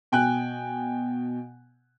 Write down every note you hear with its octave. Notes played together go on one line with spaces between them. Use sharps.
B2 G5 G#5 F#6